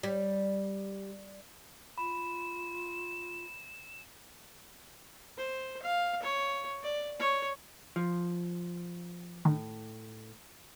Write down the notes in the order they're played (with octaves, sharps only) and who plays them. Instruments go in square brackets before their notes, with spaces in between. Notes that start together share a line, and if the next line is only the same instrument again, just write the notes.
[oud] G3
[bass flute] F4 [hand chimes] B5 [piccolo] E7
[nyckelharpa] C5
F5
C#5
D5
C#5
[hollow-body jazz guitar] F3
[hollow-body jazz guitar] A2 [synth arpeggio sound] D#3